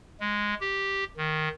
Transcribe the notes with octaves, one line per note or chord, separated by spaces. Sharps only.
G#3
G4
D#3